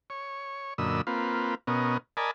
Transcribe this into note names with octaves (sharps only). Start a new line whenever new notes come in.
C#5
F#2 A#2 D3 D#5 B5 E6
A#3 C4 F4 B4
B2 B3 C#4 A#4 D#5
A#4 D5 D#5 G#5 A5 B5